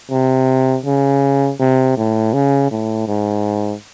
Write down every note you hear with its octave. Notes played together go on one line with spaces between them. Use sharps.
C3
C#3
C3
A2
C#3
A2
G#2